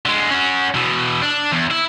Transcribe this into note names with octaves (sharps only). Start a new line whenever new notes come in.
D3 G#3
C#4 F#4
B2 E3
D4
E2
E4